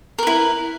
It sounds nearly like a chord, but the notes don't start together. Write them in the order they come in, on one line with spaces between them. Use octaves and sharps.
A#4 B4 E4